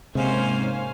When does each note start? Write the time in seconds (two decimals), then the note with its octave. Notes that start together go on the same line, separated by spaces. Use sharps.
0.15 G#2 C3 A#3 C#4 C5 C#5 F5 G#5